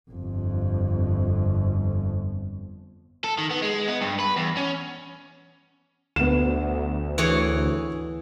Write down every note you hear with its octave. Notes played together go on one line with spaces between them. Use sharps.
G1 F2
A4
D#3
B3
G#3
B3
G2
B4
E2
C#4
D2 B3 E7
E3 G#4 C#5